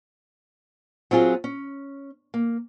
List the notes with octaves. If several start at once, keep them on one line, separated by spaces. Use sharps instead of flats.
F#3 C4 F4 G#4
C#4
A#3